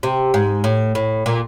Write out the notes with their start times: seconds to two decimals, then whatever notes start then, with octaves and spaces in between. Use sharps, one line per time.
0.03 C3
0.34 G#2
0.64 A2
0.95 A2
1.26 A#2